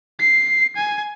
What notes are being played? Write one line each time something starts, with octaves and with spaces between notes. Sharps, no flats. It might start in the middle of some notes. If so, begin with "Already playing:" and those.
C7
G#5